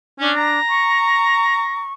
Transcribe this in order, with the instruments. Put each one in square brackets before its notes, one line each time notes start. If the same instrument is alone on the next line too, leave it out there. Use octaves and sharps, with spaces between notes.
[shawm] C#4 [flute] D4
[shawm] A#5
[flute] C#6